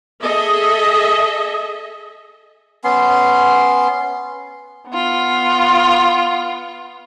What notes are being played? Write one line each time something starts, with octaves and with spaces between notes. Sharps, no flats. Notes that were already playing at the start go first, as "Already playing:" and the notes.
G#4 A4 D#5 E5
B3 C#4 C6
B3 F4